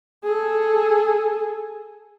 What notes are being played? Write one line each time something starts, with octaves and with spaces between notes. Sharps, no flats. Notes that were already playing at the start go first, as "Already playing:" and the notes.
G#4 A4